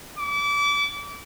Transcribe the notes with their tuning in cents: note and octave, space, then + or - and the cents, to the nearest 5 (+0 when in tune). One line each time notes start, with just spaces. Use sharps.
D6 -30